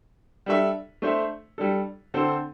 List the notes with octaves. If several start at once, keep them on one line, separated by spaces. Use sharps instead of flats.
G3 D4 A4 E5
A3 D4 C5 E5
G3 D4 A4
D3 C4 A4 C5